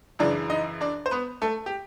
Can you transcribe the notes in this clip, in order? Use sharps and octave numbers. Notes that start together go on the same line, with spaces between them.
F#2 C#3 E3 D4 D5
D#4 D#5
D4 D5
C5
B3 B4
A3 A4
G4